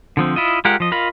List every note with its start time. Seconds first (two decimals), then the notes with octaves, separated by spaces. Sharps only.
0.17 D3 F3 C4
0.36 E4 F4 D#5
0.65 G#3 F4 G4 A#4 F#5
0.80 F3 D#5
0.92 F4 A#4 D#5 F5 B5